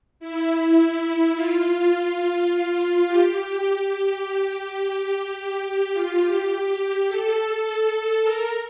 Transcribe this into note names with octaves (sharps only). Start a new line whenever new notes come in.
E4
F4
G4
G4
G4
F4
G4
A4
A#4